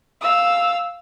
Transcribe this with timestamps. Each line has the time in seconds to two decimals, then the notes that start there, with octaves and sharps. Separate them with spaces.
0.21 F5 E6